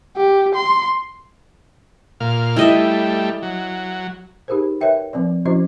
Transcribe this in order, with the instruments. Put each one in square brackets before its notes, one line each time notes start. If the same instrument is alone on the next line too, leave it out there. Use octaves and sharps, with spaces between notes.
[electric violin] G4
C6
[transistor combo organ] A#2 F5
[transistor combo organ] G3 A3 [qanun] E4 D#5 E5
[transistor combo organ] F#3
[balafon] D#4 G4 G#4 A#4 C5
A#4 B4 C#5 E5 G5
F3 C4 B4 D5
F3 C#4 E4 F#4 C5 D#5